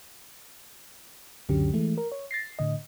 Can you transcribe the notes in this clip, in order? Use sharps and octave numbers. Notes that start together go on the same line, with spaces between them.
C#2 F#2 D3 F#3 C#4 G4
E3 G#3 A3
A#4
C#5
A6 A#6 C7
A2 D3 D#5